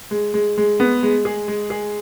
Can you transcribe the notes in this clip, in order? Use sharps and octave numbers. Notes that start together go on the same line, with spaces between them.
G#3
G#3
G#3
B3
G#3
G#4
G#3
G#4